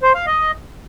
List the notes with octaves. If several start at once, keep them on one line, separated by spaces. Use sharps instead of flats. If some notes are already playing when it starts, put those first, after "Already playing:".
C5
F5
D#5